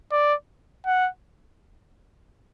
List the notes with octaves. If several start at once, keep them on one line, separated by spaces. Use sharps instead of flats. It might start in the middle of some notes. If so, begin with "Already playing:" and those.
D5
F#5